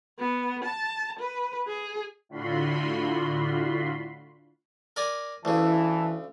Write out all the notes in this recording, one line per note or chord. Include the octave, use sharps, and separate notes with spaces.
B3
A5
B4
G#4
A2 D3 F4 F#4 B5 C6
A#4 D5 G#5
D2 C#3 E3 A5